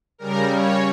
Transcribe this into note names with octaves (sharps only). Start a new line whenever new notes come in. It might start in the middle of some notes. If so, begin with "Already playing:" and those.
C#3 G3 A#4
C#5